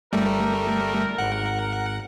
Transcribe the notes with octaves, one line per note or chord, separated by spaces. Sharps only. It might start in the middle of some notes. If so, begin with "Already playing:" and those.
G1 G3 A3 A#4
G#1 F#5